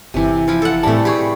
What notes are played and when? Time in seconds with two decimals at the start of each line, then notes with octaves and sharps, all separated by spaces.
0.14 G1 C3 E3
0.48 F3 E4 F4
0.62 A4 F#5
0.83 A2 E3 G3 A3 C4 A5
1.05 G4 G#4 B5 C#6